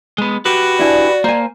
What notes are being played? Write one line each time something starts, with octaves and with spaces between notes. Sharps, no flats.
G#3 B3
F#4 G4 B4
D4 E4 D5 G#5
A#3 C5 G#5